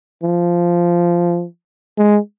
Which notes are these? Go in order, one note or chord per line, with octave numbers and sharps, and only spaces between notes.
F3
G#3